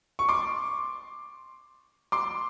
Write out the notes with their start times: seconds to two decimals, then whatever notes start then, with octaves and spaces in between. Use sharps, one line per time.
0.19 C#6
0.29 C6 D6
2.12 C6 D6